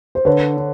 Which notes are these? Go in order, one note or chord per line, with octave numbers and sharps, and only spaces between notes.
C5
D3 B4 C#5
D3